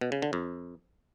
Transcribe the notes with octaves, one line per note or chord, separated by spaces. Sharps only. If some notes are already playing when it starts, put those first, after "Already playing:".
B2
C#3
D3
F2